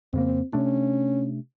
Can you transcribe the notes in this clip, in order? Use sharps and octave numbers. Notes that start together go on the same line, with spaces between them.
F2 C#3 A#3 C4
C3 A3 C#4 D4